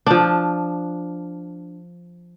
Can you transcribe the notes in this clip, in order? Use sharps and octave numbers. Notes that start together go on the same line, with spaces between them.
F3 D4